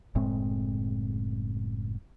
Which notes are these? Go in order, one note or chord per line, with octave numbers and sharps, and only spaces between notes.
F#1 A2 G#3 C4